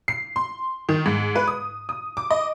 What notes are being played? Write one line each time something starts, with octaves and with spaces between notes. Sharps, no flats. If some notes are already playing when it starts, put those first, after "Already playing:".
C7
C6
D#3
G#2
B4
D#6
D#6
D6
D#5